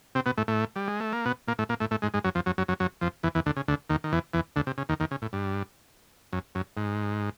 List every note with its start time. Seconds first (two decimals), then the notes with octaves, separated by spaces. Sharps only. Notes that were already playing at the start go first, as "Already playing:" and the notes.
0.15 C3 C4
0.26 B2 B3
0.37 A2 A3
0.48 A2 A3
0.76 G3
0.88 G#3
1.00 A3
1.13 A#3
1.25 B2 B3
1.48 A#2 A#3
1.59 A2 A3
1.69 A#2 A#3
1.80 A2 A3
1.91 A2 A3
2.02 G#2 G#3
2.14 G#2 G#3
2.24 F#2 F#3
2.35 F2 F3
2.46 F#2 F#3
2.58 F#2 F#3
2.68 F#2 F#3
2.80 F#2 F#3
3.01 F2 F3
3.23 E2 E3
3.35 E2 E3
3.46 D2 D3
3.57 C#3
3.68 D2 D3
3.90 D#2 D#3
4.04 D#3
4.13 E2 E3
4.34 E2 E3
4.56 D2 D3
4.67 C3
4.78 C#3
4.89 D#2 D#3
5.00 D#2 D#3
5.11 C#3
5.22 A2
5.33 G2
6.33 F#2
6.55 F#2
6.77 G#2